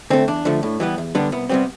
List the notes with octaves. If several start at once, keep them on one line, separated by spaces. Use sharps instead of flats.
D3 A3 C4
E2 D4
D3 F3 A3
A2
E3 G3 B3
E2
D3 G3 B3 D4
C2 B3
C3 G3 B3 C4